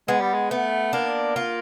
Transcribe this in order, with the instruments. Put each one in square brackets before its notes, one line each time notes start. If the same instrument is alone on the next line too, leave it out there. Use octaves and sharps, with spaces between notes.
[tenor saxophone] G#3 [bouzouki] B3
[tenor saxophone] G3
G#3
[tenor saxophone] A3 [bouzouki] B3
[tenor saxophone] A#3 [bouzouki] D4
[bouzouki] F4